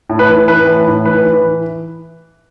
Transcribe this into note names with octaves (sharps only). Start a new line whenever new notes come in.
A2
B4
E3
E3 B4
A2
A2
E3 B4
E3